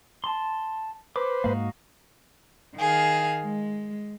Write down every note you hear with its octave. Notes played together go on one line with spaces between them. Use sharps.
A5 C6
B4 C5 D6
G#2 A#3 D#4 F#4 F5
D#3 G#4 F5
G#3